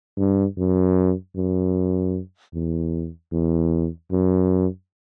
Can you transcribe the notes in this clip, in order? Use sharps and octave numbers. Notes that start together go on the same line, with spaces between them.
G2
F#2
F#2
E2
E2
F#2